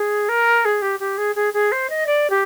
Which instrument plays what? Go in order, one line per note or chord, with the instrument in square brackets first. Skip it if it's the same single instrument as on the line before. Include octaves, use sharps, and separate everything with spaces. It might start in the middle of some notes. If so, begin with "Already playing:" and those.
Already playing: [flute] G#4
A#4
G#4
G4
G4
G#4
G#4
G#4
C5
D#5
D5
G4